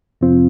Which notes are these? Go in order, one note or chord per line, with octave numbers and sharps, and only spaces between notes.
F2 C3 F3 C4 F4